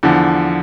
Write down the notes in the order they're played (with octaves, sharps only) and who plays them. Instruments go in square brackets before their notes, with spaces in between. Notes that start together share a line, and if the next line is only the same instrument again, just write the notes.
[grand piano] E2 D3 F3